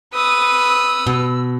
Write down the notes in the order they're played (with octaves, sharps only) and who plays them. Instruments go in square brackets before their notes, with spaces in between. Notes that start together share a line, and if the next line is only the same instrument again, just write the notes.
[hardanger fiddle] B4 D#6 [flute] E6
[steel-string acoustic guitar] B2